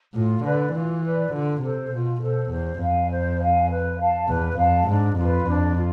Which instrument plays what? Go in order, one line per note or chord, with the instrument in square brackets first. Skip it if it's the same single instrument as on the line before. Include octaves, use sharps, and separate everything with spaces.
[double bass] A2 [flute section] F4
[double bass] D3 [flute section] B4 D5
[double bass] E3 [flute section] F4
[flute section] B4 D5
[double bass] D3 [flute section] F4
[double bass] C3 [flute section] A4 C5
[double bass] B2 [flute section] F4
[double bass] B2 [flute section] A4 C5
[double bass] E2 [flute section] C5
[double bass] F2 [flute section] F5 G#5
[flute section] C5
F5 G#5
B4
F5 A5
[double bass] E2 [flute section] B4
[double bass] F2 [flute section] F5 A5
[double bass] G#2 [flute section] D4
[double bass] F2 [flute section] F4 B4
[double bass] F2 [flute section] D4
[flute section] F4